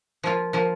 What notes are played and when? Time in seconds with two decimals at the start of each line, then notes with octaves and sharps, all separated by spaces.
0.24 F3 A#3 F4
0.53 F3 A#3 F4